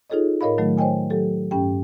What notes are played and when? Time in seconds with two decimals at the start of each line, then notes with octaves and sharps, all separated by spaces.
0.10 D#4 F4 G#4 A4 C#5 D#5
0.41 A2 A#4 C#5 D#5 F5 B5
0.58 D#3 F#3 A3
0.77 C5 C#5 D#5 G5 G#5
1.10 F#3 G4 A4
1.51 G2 C#4 G4 G5